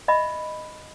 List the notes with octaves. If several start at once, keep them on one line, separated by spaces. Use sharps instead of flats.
D#5 E5 B5